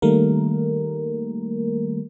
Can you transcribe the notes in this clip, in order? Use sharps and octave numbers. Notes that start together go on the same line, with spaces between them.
D#3 G3 A3 A#3 A#4